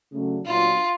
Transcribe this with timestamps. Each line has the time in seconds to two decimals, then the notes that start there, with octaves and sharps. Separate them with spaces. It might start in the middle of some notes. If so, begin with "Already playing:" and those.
0.12 C#3 F#3 A3 D4
0.44 A#2 F#3 B3 D4 F4